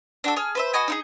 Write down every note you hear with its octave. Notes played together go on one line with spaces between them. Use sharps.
D4 F#4 A4
G#4 F6
B4 C5 E5
F#4 B4 D#5 G#5
D#4 E4 G#4